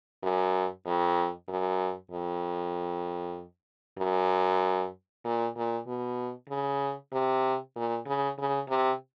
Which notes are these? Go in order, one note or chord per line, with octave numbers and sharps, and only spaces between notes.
F#2
F2
F#2
F2
F#2
A#2
A#2
B2
C#3
C3
A#2
C#3
C#3
C3